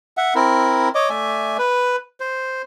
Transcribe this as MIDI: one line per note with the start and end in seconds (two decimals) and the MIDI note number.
0.17 0.34 76
0.17 0.34 78
0.35 0.89 60
0.35 0.89 64
0.35 0.89 70
0.95 1.10 73
0.95 1.10 75
0.95 1.10 86
1.10 1.57 57
1.10 1.57 74
1.10 1.57 76
1.10 1.57 80
1.58 1.96 71
2.20 2.62 72